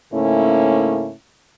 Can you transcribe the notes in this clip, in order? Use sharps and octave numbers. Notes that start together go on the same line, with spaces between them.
G#2 C#3 A3 A#3 C#4 E4